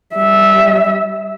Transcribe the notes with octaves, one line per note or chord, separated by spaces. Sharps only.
G3 E5